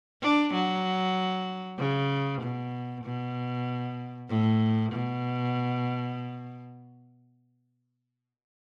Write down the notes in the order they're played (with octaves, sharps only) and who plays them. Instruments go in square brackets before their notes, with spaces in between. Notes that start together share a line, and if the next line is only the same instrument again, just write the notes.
[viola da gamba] D4
F#3
C#3
B2
B2
A2
B2